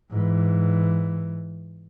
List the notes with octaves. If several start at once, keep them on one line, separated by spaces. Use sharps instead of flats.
G#2 E3